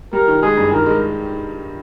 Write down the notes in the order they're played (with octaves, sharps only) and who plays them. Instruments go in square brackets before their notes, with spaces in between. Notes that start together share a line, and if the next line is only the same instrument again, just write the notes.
[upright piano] G3 [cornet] A#4
[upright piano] D#3
[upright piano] G#3 [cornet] G#4
[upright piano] G2
[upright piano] D#3 [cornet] A#4
[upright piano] G#3